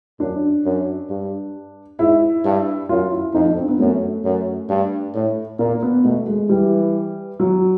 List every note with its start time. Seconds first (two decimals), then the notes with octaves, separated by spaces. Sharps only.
0.20 F#2 D4
0.65 F#2
1.09 G2
1.99 G#2 E4
2.45 G2
2.89 F#2 F4
3.12 E4
3.34 F2 D#4
3.46 D4
3.57 C4
3.68 B3
3.79 F#2 A3
4.24 F#2
4.69 G2
5.15 A2
5.59 A#2 A#3
5.83 B3
6.04 B2 A3
6.27 G#3
6.49 E3 G3
7.40 F#3